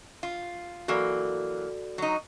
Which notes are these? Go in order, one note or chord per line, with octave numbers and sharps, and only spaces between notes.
F4
E3 F#3 A#3 F#4 A4 D5
F#3 D#4